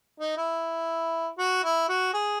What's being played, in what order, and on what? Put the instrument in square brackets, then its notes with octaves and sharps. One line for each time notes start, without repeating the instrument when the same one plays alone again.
[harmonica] D#4
E4
F#4
E4
F#4
G#4